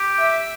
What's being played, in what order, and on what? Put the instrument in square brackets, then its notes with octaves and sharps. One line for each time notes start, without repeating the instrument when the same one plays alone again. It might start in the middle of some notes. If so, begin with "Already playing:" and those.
Already playing: [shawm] G4
[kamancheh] E5